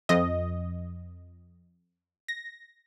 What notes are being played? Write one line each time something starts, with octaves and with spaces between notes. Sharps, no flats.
F2 D#5
A#6